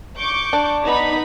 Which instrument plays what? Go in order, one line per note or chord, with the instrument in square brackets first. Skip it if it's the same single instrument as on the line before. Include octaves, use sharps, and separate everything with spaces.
[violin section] C#6 D6 G6
[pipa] D4
[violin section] B3 D#4 B5